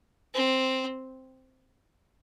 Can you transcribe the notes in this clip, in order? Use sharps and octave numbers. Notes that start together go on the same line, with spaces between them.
C4